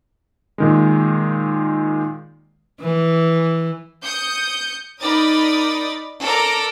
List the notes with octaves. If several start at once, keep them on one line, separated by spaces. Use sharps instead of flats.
A#2 D#3 G#3
E3
D#6 G6 C#7
D#4 A#4 D5 B5 D#6 A6
A4 A#4 D5 A#5 D6